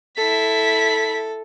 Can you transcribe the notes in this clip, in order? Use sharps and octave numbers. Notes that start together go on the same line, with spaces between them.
E4 A4 B6